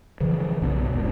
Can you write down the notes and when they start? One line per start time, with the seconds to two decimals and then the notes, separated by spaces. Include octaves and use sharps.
0.20 C#3 E3 F3
0.61 B1 G2 B2 B3
0.91 E1 C#2 G#2